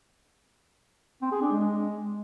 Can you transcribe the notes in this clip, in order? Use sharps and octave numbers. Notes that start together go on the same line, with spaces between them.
C4
G#4
D4
G#3